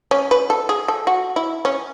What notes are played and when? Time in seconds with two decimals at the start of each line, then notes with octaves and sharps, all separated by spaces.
0.11 C#4
0.31 B4
0.50 A4
0.69 G#4
0.88 A4
1.07 F#4
1.36 E4
1.65 C#4